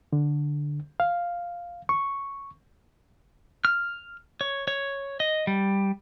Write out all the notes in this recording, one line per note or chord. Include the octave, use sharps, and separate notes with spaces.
D3
F5
C#6
F6
C#5
C#5
D#5
G3